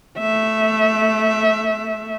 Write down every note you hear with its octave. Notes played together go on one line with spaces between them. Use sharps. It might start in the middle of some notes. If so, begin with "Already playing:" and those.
A3 E5